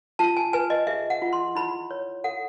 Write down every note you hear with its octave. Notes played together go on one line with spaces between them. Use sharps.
F4 A5
G#5
B4 G#5
D#5
G#4 E5
F#5
F4
C6
E4 B5
C#5
A4 F#5